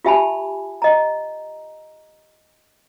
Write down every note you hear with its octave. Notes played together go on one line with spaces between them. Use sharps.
F4 G4 E5 G#5 A5 B5
D#5 A#5